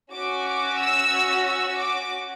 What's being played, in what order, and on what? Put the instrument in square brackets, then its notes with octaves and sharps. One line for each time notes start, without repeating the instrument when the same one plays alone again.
[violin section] C#4 F#4 D6
D6
E6
E6
D6